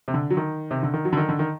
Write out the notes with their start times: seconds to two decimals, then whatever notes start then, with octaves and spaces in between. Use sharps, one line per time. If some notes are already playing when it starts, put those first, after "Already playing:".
0.08 C3
0.14 D3
0.30 F#3
0.37 D#3
0.71 C3
0.83 D3
0.94 D#3
1.05 F#3
1.13 D3
1.17 D#3
1.29 D3
1.39 D#3